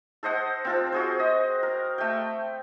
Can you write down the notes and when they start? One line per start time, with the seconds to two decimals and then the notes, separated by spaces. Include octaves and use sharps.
0.23 A4 C5 D#5 F#5
0.65 C4 F4 A4
0.92 F#4 G#4 C5
1.20 D#5
1.63 A#4
1.98 A3 G5